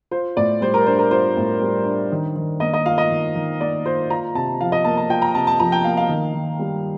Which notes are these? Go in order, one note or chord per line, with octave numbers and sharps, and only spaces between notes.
F4 C5
A2 D5
G3 C5
A#4
D4 C5
A#4
F4 C5
A2
G3
D4
D#3
D#3
A#3 D#5
D#5
F4 F5
D#5
D#3
D#3
A#3 D5
F4 C5
F4 A#5
C3 A5
F3 F5
D#5
A#3 A5
A5
F4 G5
A#5
C3 A5
A5
F3 A#5
G5
A#3 F5
F5
D#3
D#3
G3